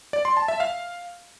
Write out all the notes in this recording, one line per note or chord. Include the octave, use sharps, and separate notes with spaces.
D5
C6
A5
E5
F5